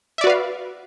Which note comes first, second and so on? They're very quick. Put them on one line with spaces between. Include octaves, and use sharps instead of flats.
E5 D5 F#4 B4 F5